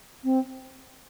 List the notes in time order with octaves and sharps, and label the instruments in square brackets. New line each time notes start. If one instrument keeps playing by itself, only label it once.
[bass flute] C4